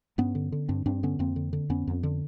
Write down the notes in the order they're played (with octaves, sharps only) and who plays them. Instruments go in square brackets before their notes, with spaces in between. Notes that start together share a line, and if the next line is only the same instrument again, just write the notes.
[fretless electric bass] G2 B3 C#4
D3
D3
G2 C4 D4
G2 C4 D4
D3 B3 C#4
F2 A#3 C4
D3
D3
F2 B3 C#4
F2
D3